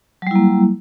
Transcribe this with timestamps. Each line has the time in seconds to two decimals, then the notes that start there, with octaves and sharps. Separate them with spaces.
0.22 F#3
0.27 G3
0.31 E4
0.35 A#3